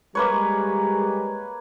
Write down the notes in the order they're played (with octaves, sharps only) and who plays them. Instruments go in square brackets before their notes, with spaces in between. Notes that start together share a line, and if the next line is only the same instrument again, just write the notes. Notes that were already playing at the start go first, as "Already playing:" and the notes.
[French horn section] G3 G#3 [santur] A#3 B4 C#5